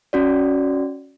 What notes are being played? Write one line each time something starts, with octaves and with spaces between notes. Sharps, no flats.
C#4 F#4 D5